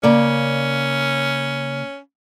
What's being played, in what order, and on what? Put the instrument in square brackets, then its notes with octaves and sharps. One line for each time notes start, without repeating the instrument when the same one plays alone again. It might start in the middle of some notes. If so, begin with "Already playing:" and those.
[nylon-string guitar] C#3 A#3 D5 [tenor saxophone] C#4